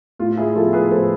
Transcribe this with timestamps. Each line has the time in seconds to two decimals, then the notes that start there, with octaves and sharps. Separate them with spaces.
0.19 A2 F4
0.38 E4 G#4
0.55 F3 F4 A4
0.58 B3
0.73 G#4 B4
0.91 A2 A4 C5